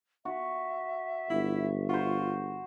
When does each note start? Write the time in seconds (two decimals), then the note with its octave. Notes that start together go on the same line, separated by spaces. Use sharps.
0.25 F#4 E5
1.30 G1 E4
1.89 F4 F#4 C5